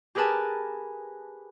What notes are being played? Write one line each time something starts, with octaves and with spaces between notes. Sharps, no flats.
G4 G#4 A#4 B4 G#5 A5